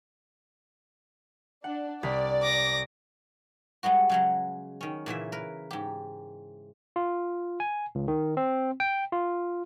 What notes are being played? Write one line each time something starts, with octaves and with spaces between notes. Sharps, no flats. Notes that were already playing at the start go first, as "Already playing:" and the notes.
D4 F#5
C2 D5 B6
D6 A#6
G3 G#3 B3 F#4
C#3 F#3 G#3
D#3 C#4
A#2 C#3 E3 E5
A#4 B4
G#2 G4
F4
G#5
C#2
D#3
C4
G5
F4